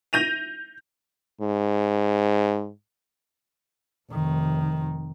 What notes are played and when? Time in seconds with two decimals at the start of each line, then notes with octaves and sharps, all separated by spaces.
0.13 G6 A#6 D#7 F7
1.41 G#2
4.11 F1 D#3